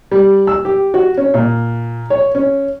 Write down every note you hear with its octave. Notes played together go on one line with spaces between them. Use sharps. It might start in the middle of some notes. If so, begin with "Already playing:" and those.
G3
E6
G4
F#4
C#4
A#2
C#5
C#4